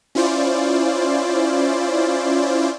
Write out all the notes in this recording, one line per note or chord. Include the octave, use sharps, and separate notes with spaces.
C#4 E4 F4 C5 D5